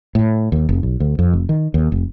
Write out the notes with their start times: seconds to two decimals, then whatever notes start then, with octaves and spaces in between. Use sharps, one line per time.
0.15 A2
0.52 D#2
0.69 F1
0.83 B1
1.00 D2
1.19 F2
1.33 F1
1.49 D#3
1.74 D#2
1.92 F1